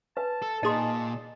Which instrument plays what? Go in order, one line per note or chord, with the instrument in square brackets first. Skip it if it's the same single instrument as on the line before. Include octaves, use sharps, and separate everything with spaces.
[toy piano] B4 [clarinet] A5
[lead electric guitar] A4
[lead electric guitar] A#2 [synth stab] D#4 G#4 [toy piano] D#5 C6